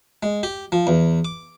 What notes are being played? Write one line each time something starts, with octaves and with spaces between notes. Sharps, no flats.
G#3
G4
F3
E2
D6